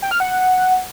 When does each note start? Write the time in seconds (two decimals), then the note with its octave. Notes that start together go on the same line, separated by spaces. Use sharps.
0.02 G5
0.11 F6
0.20 F#5